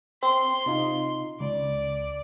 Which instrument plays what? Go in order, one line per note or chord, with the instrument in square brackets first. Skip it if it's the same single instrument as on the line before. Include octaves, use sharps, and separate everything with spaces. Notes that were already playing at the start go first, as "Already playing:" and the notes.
[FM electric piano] C4 [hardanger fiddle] C6
[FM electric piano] C3 D#4 F4
[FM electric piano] C#2 [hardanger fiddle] D5